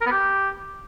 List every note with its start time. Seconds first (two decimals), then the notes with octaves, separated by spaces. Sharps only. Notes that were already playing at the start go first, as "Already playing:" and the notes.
0.01 A#4
0.06 B3
0.11 G4